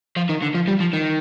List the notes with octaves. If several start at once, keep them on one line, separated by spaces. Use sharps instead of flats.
F3
D#3
D3
F3
G3
F3
D#3